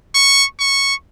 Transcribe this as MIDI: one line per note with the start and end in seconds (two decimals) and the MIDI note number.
0.15 0.45 85
0.60 0.95 85